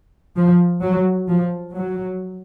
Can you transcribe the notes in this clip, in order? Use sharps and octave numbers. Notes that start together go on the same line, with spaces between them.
F3
F#3
F3
F#3